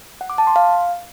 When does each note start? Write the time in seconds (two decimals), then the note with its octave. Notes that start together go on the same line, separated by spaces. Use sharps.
0.21 F#5
0.30 D6
0.38 A5
0.47 C6
0.56 F5